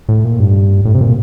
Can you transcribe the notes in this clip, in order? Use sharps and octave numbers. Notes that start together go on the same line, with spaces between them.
A2
A#2
G2
A2
C3
A#2